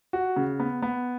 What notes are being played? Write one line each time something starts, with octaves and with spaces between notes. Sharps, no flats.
F#4
C#3
B3
B3